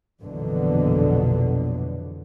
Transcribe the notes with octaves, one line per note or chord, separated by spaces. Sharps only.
A#1 F2 B2 D3 E3 F#3